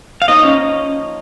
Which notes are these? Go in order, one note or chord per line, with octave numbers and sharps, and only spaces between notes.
F5
F3 A#3 D#4 C#5 D#5
C#4